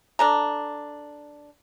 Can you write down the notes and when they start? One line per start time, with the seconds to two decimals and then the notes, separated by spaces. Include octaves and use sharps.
0.19 D4 A4 A#5